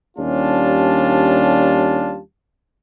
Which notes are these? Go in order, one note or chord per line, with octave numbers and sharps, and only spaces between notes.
D#2 G3 C#4 D4 F4 A5